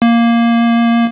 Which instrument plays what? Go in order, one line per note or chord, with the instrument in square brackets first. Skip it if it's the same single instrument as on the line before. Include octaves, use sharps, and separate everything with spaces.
[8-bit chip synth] A#3